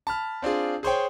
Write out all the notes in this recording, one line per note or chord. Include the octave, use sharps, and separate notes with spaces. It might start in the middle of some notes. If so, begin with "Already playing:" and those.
A5 B5 F6
C4 D4 F4 G#4
G#4 C5 C#5 G5